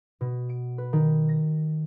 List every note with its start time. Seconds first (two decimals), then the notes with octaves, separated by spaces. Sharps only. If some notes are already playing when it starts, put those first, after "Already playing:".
0.21 B2
0.49 D7
0.78 B4
0.93 D#3
1.29 A#6